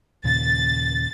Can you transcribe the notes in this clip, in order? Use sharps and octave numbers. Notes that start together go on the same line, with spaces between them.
D#2 A#2 C#3 A6